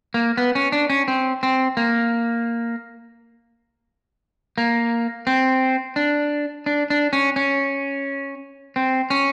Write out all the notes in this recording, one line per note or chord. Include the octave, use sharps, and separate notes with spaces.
A#3
B3
C#4
D4
C#4
C4
C4
A#3
A#3
C4
D4
D4
D4
C#4
C#4
C4
C#4